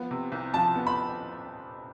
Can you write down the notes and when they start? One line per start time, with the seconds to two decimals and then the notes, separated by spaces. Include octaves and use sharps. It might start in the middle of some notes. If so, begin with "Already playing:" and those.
Already playing: F3 B3
0.11 C3
0.32 C2
0.54 F3 A5
0.75 B3
0.87 B5